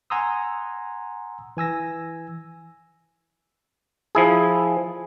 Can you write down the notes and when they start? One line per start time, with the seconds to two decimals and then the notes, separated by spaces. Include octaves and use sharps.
0.10 F#5 G#5 A#5 C6 D#6 E6
1.57 E3 G#5 E6 A#6
4.15 F3 E4 G#4